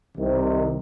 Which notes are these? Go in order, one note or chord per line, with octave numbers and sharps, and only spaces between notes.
C2 C3 D#3